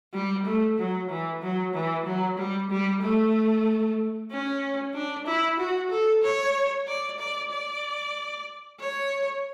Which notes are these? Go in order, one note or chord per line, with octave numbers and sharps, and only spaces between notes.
G3
A3
F#3
E3
F#3
E3
F#3
G3
G3
A3
C#4
D4
E4
F#4
A4
C#5
D5
D5
D5
C#5